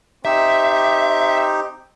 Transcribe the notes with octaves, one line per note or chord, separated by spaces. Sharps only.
C4 D#4 G4 E5